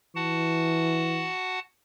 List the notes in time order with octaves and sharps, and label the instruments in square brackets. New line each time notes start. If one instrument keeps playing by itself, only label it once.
[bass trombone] E3 [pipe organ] F#4 F#5 A5